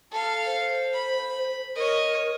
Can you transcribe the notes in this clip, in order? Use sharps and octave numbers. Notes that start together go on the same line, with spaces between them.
A4 F5 A5
C5
B5
A#4 C#5 D#5